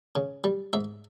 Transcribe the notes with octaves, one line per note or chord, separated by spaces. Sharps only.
C#3
G3
G#2 E5